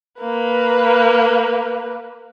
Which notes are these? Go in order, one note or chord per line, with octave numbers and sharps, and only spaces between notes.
A#3 B4